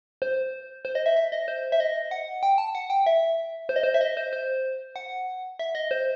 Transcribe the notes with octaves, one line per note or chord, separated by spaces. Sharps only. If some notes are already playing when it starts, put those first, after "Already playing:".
C5
C5
D#5
E5
E5
D#5
C5
E5
D#5
F#5
G5
A5
F#5
G5
E5
C5
D#5
C5
E5
D#5
C5
C5
F#5
E5
D#5
C5